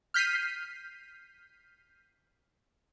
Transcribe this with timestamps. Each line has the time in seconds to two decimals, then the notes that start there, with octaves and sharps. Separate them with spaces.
0.14 F6 G6 B6 C7 D#7